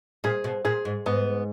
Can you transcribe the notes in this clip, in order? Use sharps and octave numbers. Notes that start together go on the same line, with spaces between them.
A#2 G#4
B2
A#2 G#4
G#2
G#2 B3